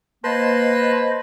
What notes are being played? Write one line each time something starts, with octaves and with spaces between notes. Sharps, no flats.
A#3 B4 C5 D#5 A5 C6